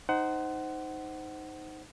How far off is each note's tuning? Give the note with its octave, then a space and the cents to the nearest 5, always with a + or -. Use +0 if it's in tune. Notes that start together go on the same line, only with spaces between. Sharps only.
D#4 +0 C5 -10 F#5 +20